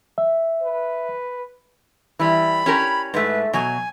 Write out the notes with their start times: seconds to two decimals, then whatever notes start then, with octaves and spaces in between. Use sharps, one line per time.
0.18 E5
0.63 B4
2.19 E3 G3 B5
2.66 C#4 G4 A#4
3.14 G#2 A3 B4
3.53 B2 F#3 G#5